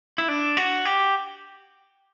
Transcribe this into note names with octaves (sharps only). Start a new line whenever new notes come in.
E4
D4
F#4
G4